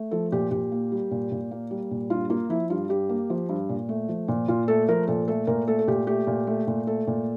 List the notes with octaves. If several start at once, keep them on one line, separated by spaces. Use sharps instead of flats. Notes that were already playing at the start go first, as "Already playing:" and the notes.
Already playing: A3
F3 A4
A#2 G4
A#2 G4
A#3
G3
A#2
A#2
A#3
G3
A#2
G2 F4
A#3 F4
F3 E4
G2 F4
G2 G4
A#3
F3
G2
A#2
A3
F3
A#2
A#2 F4
A3 A4
F3 A#4
A#2 A4
A3 A4
A#2 A#4
A3 A4
A4
A#2 G4
A3 G4
A#2
A3
A#2
A3 A4
A#2